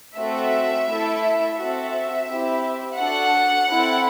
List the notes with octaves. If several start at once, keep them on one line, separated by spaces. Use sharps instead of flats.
A3 C4 F#4 A4 E5
A3 E4 A4
C4 F#4 A4 E5
C4 E4 G4
D4 F#4 A4 F#5
C4 E4 A4